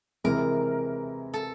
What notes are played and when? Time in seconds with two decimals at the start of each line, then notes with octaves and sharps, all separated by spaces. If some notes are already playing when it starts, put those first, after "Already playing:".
0.24 C3 E3 G#3 A#4
1.34 A4